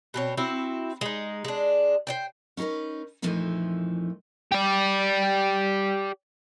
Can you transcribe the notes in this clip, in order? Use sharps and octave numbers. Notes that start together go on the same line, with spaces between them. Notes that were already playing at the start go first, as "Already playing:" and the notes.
B2 C4 C#5
C4 E4 F#4
G#3 D#4
G#3 D4
C5 D5 G5
C#4 D#4 G4 A#4 B4
F2 A#2 E3 F3 A3 D#4
G4 D5